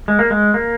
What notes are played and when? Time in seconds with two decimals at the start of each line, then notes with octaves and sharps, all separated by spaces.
0.08 G#3
0.19 A#3
0.30 G#3
0.54 A#3